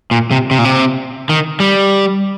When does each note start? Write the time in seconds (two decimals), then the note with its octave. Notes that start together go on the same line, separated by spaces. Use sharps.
0.11 A#2
0.31 C3
0.51 C3
0.58 A#2
0.65 C3
1.29 D#3
1.60 G3